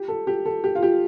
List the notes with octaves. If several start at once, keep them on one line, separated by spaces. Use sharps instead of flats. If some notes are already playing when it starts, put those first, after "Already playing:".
Already playing: G4
A4
G4
A4
G4
F4
G4